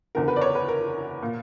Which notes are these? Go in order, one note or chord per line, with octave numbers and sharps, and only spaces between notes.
F#1 E2 D3 A#4
B4
D5
C#5
B4
A#4
A#2